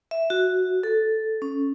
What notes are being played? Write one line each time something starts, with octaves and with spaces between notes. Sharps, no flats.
E5
F#4
A4
C#4